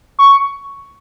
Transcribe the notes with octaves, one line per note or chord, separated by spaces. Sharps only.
C#6